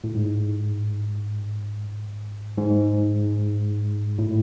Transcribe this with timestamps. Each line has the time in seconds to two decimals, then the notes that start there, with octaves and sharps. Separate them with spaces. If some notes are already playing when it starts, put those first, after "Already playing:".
0.04 A2
0.15 G#2
2.58 G#2
4.19 A2